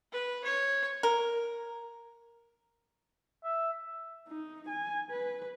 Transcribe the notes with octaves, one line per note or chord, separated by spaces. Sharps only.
B4
C#5
A#4
E5
D#4
G#5
B4